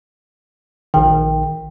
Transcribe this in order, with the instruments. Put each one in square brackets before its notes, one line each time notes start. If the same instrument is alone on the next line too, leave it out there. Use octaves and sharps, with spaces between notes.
[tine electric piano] A#1 D#3 [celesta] G5